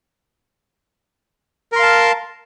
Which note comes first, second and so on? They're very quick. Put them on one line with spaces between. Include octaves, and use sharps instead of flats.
A#4 C6 F5 A5